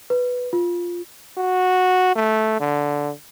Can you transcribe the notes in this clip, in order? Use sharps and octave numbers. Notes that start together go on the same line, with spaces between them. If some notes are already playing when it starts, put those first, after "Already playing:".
B4
F4
F#4
A3
D3